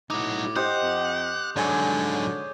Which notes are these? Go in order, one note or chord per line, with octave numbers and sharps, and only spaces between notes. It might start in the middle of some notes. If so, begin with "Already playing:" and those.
A2 D#4 F#4 D6
G4 C5 D#5 F#5 G6
F2
G#2 D3 F#3 G#4 C#5 D5